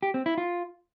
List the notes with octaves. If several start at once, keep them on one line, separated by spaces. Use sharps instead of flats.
G4
C4
E4
F4